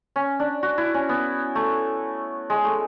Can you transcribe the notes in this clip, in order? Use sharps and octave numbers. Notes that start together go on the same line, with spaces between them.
C#4
D4
F#4
E4
C#4
B3
A3
G#3
A3